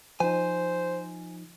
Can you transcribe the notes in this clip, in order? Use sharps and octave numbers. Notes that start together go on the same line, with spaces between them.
F3 D#4 C5 G#5